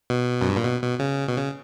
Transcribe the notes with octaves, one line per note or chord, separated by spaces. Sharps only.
B2
F#2
G2
A#2
B2
B2
C#3
B2
C#3